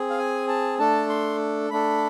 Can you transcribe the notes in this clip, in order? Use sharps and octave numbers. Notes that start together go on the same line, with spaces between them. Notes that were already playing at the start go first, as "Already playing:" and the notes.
Already playing: C4 G#4
F5
G#5
A5
A3 D4 A4 A5
C6
A3 D4 A4 B5